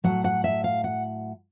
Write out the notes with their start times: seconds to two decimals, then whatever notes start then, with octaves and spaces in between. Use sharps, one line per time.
0.04 A2 F#3 F#5
0.24 F#5
0.44 E5
0.64 F5
0.84 F#5